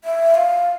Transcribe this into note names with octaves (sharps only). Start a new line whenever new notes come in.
E5
F5